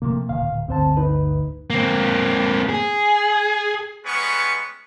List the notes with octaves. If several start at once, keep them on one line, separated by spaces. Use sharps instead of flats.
C3 F3 A3 A#3
D1 A#2 D#3 F5
G1 D2 C4 C5 A5
D#4 B4
A#3 C4
G#4
G3 G#3 B3 C#4 B4 C#6